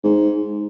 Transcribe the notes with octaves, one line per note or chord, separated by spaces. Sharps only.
G#2